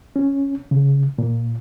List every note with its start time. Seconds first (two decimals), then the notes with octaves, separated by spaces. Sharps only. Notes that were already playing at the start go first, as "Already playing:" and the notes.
0.16 C#4
0.71 C#3
1.18 A#2